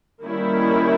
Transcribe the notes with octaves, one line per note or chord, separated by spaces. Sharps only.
D#3 G3 A#3 C#4 E4